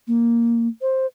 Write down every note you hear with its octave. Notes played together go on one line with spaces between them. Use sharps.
A#3
C5